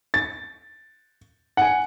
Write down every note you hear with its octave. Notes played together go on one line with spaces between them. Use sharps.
A6
F#5 G#5